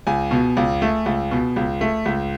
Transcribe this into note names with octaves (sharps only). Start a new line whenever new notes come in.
C#2 G#5
B2
C#2
A3
C#2
B2
C#2
A3
C#2